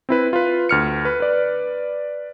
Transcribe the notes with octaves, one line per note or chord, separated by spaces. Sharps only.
C4 E4 B4
F4 B4
D2 F6 C#7
B4
B4 D5